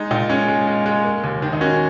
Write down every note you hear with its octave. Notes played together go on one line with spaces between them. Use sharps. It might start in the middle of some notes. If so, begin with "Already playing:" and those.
Already playing: G#3 D#4
A#2 D#4
G#3 C#4
G#3
G#3
G#3
A#3
D#2
D#3
D#4
A#3 C#4 F#4